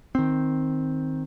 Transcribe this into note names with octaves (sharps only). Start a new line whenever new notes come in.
D#3 C4